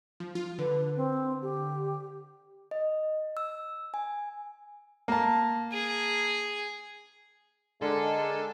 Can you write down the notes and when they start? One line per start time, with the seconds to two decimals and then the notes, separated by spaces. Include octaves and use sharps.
0.20 F3
0.35 F4
0.59 D3 B4
0.97 C4
1.42 G4
2.71 D#5
3.37 E6
3.94 G#5
5.08 A#3 A5
5.72 G#4
7.82 D3 G#3 D4 A4 A#4 G#5